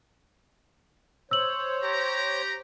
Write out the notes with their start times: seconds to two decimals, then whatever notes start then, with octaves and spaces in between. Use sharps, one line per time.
1.31 C5 C#5 E6 F#7
1.82 G4 A#5